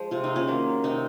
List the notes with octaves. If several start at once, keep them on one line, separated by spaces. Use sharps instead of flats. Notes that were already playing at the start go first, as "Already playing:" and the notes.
Already playing: F3 G#3
C3 F4
D#4
C#4 F4
D#3 F#3 A#3
C3 D#4